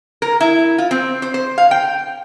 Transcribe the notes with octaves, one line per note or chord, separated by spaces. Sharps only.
A#4
E4
F4
C4
C5
C5
F5
G5